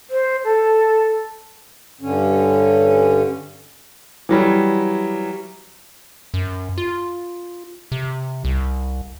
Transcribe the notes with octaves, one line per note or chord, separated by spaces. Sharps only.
C5
A4
G2 D3 C#4
E3 F#3 G3
F#2
F4
C3
C2